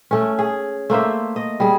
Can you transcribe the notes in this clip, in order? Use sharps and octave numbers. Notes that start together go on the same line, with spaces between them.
A3 C#4
G#4
A3 A#3 C5 E5
D#5
G3 G#4